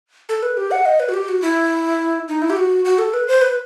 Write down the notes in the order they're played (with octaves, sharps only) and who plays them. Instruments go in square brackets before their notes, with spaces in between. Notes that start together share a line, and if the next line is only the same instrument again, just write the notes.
[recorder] A4
B4
G4
F#5
D#5
B4
F#4
G4
F#4
E4
D#4
E4
G4
F#4
F#4
A4
B4
C5
B4